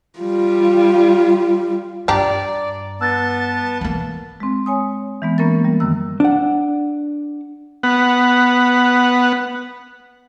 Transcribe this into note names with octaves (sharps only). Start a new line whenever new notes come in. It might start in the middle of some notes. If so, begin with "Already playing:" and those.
G3 F4
G2 D4 G4 D5 A#5
B3 A5 E6 F#6 A6
E3 A#3
G#3 C4
C#5 G#5 D#6
E3 G#3 B3
A#3 C#4 A#4 B5 A6
G3
F#2 D#3 E6
D4 F#5
B3 F#5